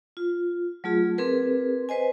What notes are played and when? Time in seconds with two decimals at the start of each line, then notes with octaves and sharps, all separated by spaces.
0.17 F4
0.84 F#3 A3 F4 G#4
1.18 C4 G#4 A#4 B4
1.89 B4 C5 D#5 G#5